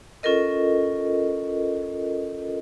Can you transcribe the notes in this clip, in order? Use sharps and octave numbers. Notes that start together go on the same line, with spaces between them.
C#4 F4 A4 A#4 D#5